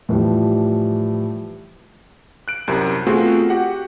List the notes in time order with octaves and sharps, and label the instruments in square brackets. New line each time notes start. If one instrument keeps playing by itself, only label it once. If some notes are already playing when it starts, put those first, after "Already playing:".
[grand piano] A2 E3 F3 G3
[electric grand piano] F#6 D7
C2 F#2 C3
A3 B3 C4 F4 F#4 G#4
F#4 G4 F#5